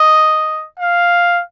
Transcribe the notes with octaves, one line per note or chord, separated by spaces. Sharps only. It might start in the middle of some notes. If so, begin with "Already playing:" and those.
Already playing: D#5
F5